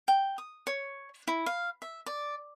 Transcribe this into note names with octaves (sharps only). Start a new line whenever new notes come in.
G5
D#6
C#5
E4
F5
E5
D5